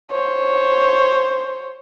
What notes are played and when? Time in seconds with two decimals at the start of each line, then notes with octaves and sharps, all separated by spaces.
0.11 C5 C#5